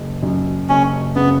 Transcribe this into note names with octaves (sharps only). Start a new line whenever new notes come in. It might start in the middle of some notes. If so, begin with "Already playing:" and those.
Already playing: F#1
F#2
F#1 C#4
C#3 B3